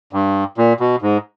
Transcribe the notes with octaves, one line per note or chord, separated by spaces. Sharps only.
G2
A#2
B2
G#2